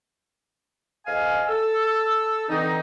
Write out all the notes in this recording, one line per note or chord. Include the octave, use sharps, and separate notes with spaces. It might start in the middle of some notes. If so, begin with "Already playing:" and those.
F2 D#5 F5 G#5
A4 E6
D3 E3 C4 D#4